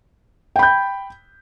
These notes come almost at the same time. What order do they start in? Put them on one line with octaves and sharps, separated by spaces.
G5 B5 G6